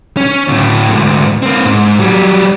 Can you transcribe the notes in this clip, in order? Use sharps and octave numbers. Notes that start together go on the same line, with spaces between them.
C#4
D2 A2
D2 G#2
A#3 C4
G#2
F#3 G3